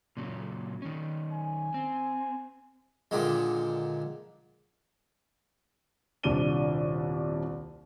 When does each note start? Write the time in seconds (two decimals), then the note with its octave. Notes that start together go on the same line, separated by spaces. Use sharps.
0.17 A#2 C#3 F#3
0.82 D#3 C#4
1.32 G#5
1.74 C4
3.11 A#2 D3 D#3 G#3
6.23 D#1 C2 D4 D5 D#7 G7